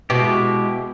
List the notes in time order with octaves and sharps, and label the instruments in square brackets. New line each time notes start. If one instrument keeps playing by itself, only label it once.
[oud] B2 [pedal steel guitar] G#3 E4 G4